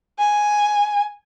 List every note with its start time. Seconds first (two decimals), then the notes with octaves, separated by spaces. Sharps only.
0.19 G#5